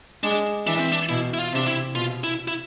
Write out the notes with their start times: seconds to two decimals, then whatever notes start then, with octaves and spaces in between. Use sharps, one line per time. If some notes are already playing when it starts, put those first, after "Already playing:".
0.23 G#3 D4
0.66 E3 D4
0.79 C4
0.92 D4
1.09 B2 E4
1.34 E4
1.39 F4
1.53 C3 D4
1.67 E4
1.95 B2 F4
2.24 E4
2.48 E4